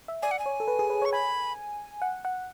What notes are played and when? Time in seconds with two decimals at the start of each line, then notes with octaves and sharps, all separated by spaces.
0.08 E5
0.22 D5 G#5
0.31 F#5
0.39 G#5
0.46 C#5
0.60 A4
0.68 B4
0.79 G#4
0.90 B4
1.02 C#5
1.05 C#6
1.12 G#5 B5
2.02 F#5
2.25 F#5